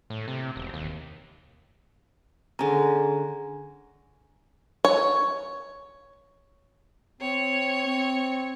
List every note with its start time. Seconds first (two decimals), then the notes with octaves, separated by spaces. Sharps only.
0.10 A2
0.28 C3
0.56 E1
0.74 D#2
2.59 D3 C#4 G#4 G#5 A#5
4.85 C#5
7.21 C4 C#5
7.86 C4